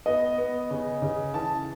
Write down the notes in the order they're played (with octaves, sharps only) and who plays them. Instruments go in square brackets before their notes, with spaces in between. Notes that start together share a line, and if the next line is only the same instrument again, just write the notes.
[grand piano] B3 D#5
B3
C#3
C#3
E3 A5